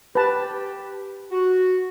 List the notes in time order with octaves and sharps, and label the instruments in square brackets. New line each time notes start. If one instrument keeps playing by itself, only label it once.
[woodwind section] G4 [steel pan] B4 A5
[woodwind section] F#4